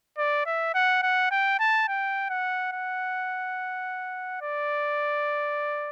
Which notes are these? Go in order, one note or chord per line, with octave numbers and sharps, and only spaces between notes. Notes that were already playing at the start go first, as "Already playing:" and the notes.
D5
E5
F#5
F#5
G5
A5
G5
F#5
F#5
D5